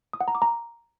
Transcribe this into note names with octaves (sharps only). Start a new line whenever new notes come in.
D#6
F#5
A#5
D6
A#5